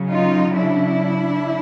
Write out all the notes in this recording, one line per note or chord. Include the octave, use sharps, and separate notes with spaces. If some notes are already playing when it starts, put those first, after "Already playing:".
Already playing: C#3 F#3
D#4 F4
D4 E4